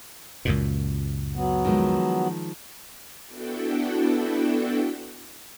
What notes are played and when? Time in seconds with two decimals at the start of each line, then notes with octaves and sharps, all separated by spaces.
0.45 C#2 F#2 A#2
1.35 F#3 B3
1.65 D#3 F3 G#3
3.25 B3 D4 E4 F#4 A4 G5